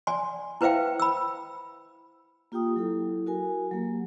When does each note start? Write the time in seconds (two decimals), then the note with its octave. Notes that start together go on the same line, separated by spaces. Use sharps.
0.07 D5 G#5 C6
0.61 E4 B4 C5 E5 F5 G5
1.00 B5 E6
2.52 A#3 F4 G4 G5 D#6
2.76 F#3 E4 A4
3.26 F#4 A#4 G#5
3.71 F#3 A#3 G4